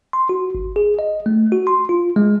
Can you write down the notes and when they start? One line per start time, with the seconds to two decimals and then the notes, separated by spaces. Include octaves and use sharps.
0.13 C6
0.29 F#4
0.55 G#1
0.76 G#4
0.99 D#5
1.26 A3
1.52 F#4
1.67 C6
1.89 F4
2.16 G#3